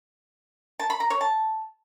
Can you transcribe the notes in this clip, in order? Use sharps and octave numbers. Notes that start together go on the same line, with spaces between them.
A5
B5
A#5
C#5
A5